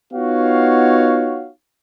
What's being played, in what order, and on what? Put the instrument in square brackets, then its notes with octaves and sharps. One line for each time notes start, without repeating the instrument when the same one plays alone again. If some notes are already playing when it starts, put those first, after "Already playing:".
[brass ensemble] B3 D#4 F4 F#4 C#5 F5